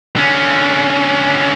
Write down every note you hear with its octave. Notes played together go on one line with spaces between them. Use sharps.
D3 C#4